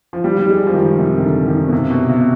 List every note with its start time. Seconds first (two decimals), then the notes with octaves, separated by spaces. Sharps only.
0.13 F3
0.24 G3
0.39 G3
0.49 G#3
0.67 F3
0.74 D#3
0.98 C3
1.18 D#3
1.23 D3
1.48 D#3
1.68 B2
1.73 C3
1.90 B2
2.09 C3